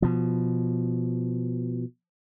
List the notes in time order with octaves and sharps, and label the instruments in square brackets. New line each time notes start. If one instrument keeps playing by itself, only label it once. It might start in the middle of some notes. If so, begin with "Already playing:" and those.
[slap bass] B2 F3